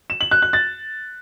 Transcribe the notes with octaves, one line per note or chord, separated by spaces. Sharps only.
E7
F#7
F#6
F#6
A6